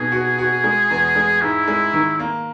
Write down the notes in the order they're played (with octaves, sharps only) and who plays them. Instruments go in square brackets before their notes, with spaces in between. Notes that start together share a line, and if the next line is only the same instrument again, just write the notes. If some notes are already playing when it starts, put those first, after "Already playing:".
Already playing: [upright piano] B2 D#4 [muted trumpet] G#4
[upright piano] F#4
F#4
G#3
E2
G#3
[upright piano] G#2 [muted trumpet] E4
[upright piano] G#3
D#3
A#3